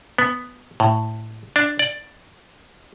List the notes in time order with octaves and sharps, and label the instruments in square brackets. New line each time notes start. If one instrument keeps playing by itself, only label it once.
[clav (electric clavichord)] B3
A2
D4
D5